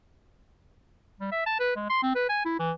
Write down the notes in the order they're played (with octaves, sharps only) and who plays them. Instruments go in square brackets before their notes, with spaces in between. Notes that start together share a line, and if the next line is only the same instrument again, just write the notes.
[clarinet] G3
E5
A5
B4
G#3
C6
C4
B4
G#5
E4
E3